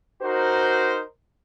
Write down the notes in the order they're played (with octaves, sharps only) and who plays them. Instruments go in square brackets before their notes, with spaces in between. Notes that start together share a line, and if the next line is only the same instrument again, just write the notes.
[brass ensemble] D#4 F#4 A#4 C5